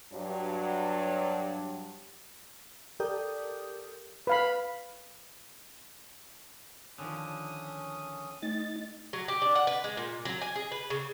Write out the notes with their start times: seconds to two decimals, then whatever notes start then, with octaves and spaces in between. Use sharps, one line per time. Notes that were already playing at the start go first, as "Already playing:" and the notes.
0.12 G2 F#3
3.00 G4 A4 A#4 D5 D#6 G6
4.27 B4 F5 B5
6.98 D3 D#3 F3 C#4 D#6
8.42 A3 D#4 A6
9.13 F#3
9.28 G4
9.42 D4
9.55 F#5
9.67 B4
9.84 G#3
9.97 A#2
10.25 F#3
10.41 G#5
10.56 G#4
10.72 B4
10.90 C#3